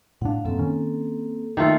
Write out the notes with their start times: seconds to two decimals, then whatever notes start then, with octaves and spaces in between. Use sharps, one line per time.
0.22 A2 D4 F5 F#5
0.45 F#2 A2 A#3 C4 A4
0.58 D#3 C#4
1.57 D#3 A3 A#3 F4